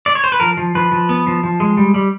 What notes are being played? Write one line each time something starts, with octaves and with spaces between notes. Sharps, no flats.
D5
C#5
C5
B4
F3 A#4
F3
F3 B4
F3
B3
F3
F3
G#3
G3
G3